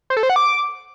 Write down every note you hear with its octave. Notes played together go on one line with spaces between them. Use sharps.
C5
A4
C5
F#5
D6